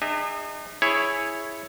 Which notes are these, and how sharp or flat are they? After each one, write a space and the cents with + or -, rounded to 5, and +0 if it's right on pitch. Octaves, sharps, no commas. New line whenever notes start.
D#4 -45 G#4 -35 E5 -25
E4 +0 G#4 +0 C#5 -5